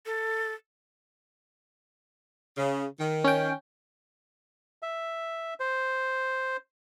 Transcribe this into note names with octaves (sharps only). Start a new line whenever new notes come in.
A4
C#3
D#3
C#4 G5
E5
C5